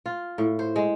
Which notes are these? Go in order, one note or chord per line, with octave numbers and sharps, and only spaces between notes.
F4
A2
C5
G#3